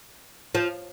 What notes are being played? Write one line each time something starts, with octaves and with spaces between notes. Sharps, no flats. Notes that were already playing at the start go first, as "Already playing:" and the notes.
F3